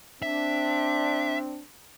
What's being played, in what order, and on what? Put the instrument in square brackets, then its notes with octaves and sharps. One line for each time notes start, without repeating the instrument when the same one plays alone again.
[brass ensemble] C4 D4 [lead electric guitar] E5